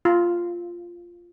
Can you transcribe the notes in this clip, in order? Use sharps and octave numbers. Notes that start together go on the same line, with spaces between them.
F4